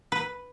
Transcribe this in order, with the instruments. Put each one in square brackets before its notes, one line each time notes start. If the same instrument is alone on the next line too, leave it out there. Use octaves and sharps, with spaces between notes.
[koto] B4